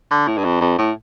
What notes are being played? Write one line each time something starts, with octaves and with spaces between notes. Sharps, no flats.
D3
A2
G2
F2
F2
A2